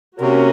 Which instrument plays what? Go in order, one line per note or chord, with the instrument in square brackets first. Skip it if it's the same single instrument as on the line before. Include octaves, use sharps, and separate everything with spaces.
[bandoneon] C3 [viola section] A#3 C#4 F#4 A#4